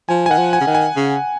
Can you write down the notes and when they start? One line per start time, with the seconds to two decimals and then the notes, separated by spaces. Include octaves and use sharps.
0.09 F3 G#5
0.26 G#5
0.30 D#3 F#5
0.38 F3
0.53 G#5
0.61 C#3
0.67 D#3
0.75 G#5
0.96 C#3